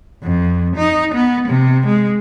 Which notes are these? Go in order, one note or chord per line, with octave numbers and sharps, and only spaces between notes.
F2
D#4
B3
C3
G#3